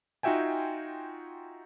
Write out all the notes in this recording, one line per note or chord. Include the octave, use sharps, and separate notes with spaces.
D#4 F4 F#4 E5 G5 G#5